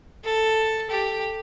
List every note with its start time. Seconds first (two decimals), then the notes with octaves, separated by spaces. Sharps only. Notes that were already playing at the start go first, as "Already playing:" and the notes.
0.25 A4
0.90 G4